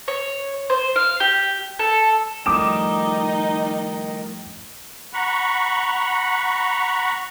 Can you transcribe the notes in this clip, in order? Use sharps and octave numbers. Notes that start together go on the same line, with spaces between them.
C#5
C5
F5
G4
A4
A2 D#3 F3 G3 D#4 D6 D#6 E7
F#5 A#5 B5 C#6